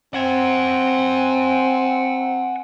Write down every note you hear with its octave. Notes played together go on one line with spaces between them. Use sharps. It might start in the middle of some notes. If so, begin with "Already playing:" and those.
C4 F#5 G#5